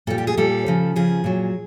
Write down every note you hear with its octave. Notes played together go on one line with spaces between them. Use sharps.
A#2 G3 A4
G4
G#4
A#2 G3 A4
C#3 F3
C#3 F3 G#4
A#2 F#3